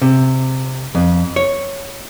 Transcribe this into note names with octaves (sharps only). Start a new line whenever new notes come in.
C3
F2
C#5